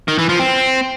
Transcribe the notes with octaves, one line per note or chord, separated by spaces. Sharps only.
D#3
E3
F3
C4